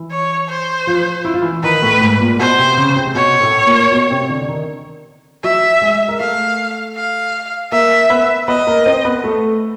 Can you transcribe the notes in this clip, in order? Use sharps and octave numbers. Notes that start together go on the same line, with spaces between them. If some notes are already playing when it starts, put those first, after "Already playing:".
Already playing: E3 E4
C#5
C5
F3 F4
E4
F4
E3 E4
D#3 D#4 B4
A2 A3
G#2 G#3
A#2 A#3
B2 B3 C5
C3 C4
C#3 C#4
C3 C4
B2 B3 C#5
A2 A3
A#2 A#3
B2 B3
C3 C4
D3 D4
D4
D#3 D#4
F#3 F#4 E5
G#3 G#4
A#4
A3 A4 F5
F5
A#3 A#4 E5
B3 B4
B3 B4 D#5
A#3 A#4
C4 C5
B3 B4
A3 A4